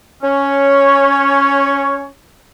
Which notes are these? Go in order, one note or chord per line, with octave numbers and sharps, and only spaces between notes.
C#4 C#5